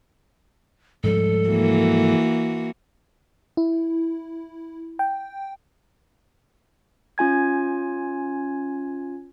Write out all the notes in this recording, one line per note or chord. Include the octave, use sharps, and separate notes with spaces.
G#2 F3 G3 A4
E3 A#3 F#4
E4
G5
C#4 F4 G#5 G#6